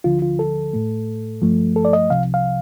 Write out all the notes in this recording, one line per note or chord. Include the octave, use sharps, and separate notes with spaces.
D2 D3 F3 F4
F4
A4
A2 A3
G2 F3 A3
A4
D5
D#5
C2 C3 F3 F5
F5